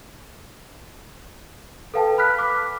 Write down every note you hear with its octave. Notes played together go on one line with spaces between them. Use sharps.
A4 B4 F5 G5 A5
B5 F6 F#6 B6
D6 B6